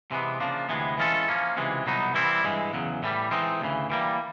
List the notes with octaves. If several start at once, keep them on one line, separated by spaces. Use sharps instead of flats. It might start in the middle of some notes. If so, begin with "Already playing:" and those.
C3 E3 G#3 B3
C#3 F3 A#3 D4
D2 C3 E3 G#3 B3
E3 G#3 C#4 F4 A4
F3 A#3 C#4
C#2 C3 E3 G#3
C2 B2 F#3 B3 D#4
E3 G3 C4 E4
G2 E3 G#3
E2 C#3 F#3
A2 E3 G3
E3 G#3 C4 D#4
D2 C#3 E3
E3 G3 A#3